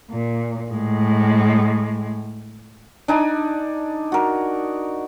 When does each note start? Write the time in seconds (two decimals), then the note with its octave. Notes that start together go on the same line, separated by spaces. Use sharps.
0.11 A#2
0.71 A2 G#3
3.08 D4 D#4 G#5
4.12 F#4 A#4